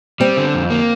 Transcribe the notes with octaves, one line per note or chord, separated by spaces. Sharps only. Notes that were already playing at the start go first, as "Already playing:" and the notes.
G3 C4
D3
F2
A#3